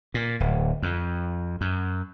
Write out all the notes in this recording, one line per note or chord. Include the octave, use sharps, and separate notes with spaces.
A#2
D1
F2
F#2